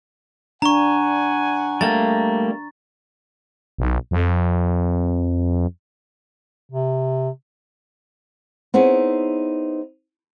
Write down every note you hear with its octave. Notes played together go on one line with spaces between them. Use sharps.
D4 F#5 G#5 A#5 C#6
G3 A3 A#3 A6
B1
F2
C3
B3 C4 D#4 E4 G#4 C#5